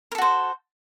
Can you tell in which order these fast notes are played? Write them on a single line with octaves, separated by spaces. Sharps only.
A#4 A4 F#4 C5